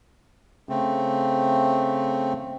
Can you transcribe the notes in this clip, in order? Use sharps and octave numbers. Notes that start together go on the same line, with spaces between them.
C#3 A3 C4